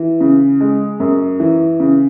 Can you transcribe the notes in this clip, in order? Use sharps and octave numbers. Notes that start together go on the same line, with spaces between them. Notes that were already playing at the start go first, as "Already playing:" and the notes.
Already playing: E3
C#3
G#3
F#2
E3
C#3